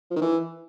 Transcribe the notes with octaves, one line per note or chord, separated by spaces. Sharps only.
F3
D#3
E3